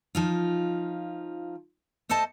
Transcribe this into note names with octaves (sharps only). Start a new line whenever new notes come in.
F3 D#4 F4
A3 A4 C5 D#5 A5